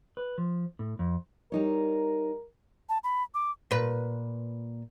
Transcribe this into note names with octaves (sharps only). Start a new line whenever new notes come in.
B4
F3
A2
F2
G3 D#4 A#4 C#5
A5
B5
D6
A#2 B4